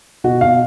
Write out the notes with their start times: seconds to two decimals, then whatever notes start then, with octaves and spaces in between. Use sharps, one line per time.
0.24 B2 F#4
0.41 B2 F5